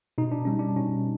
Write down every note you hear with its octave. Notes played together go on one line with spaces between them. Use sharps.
B2 D#4
D4
G3 C#4
D4
B2 C#4